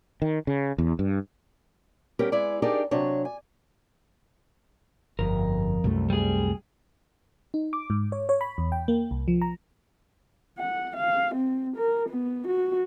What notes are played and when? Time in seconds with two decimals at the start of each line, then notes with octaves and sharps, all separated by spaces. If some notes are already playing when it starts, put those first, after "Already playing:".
0.22 D#3
0.47 C#3
0.78 E2
0.99 G2
2.19 G3 B3 C#4 G4 A#4 B4
2.32 G#3 B3 E4 G#4 D5
2.62 D4 D#4 G4 G#4 A#4 D5
2.91 C3 F#3 D4 C#5
3.25 G#5
5.19 G1 F2 A#4
5.84 C2 F#2 A3
6.10 G3 G#4
7.54 D#4
7.73 D6
7.90 G#2
8.12 C#5
8.29 C#5
8.41 B5
8.58 E2
8.72 G5
8.88 A#3
9.11 C2
9.28 F3
9.42 A#5
10.58 F#5
10.96 F5
11.35 C4
11.77 A#4
12.10 B3
12.48 F#4